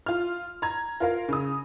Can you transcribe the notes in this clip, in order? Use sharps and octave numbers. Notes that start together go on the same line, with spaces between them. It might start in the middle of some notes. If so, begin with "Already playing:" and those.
F4 F6
A#5 G#6
F4 A#4 F5
C#3 D#6